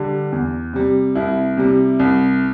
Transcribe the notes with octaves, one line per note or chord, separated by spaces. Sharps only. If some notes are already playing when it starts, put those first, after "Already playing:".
Already playing: D3 G3
E2
C3 G3
C2 E4
C3 G3
C2